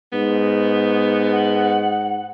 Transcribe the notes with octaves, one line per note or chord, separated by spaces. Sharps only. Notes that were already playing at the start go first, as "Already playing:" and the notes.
G#2 B3
F#5